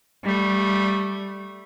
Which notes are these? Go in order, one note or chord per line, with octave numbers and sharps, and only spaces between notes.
G3 A3